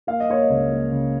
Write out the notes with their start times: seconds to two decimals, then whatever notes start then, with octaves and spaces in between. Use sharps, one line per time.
0.07 A#3 F5
0.20 D#5
0.30 A#3 C#5
0.42 D#5
0.50 C#2
0.72 A#3
0.92 C#3